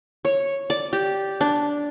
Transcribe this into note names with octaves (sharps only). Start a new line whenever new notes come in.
C#5
D5
G4
D4